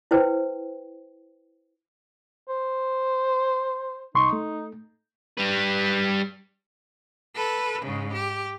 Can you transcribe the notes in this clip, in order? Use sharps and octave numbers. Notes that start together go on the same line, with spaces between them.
E4 B4 C5 G5
C5
C2 D#4 C6 C#6
A3
G3 B4
A4 B4
G#2 C#3
G4